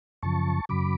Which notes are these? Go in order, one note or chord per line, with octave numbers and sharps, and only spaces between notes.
F#2 C#3 F3 A5 C#6
F#2 C#3 F#3 B5 D6